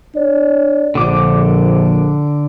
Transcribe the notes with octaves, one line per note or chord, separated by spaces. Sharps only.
D4 C#5 D5
A#1 D3 D6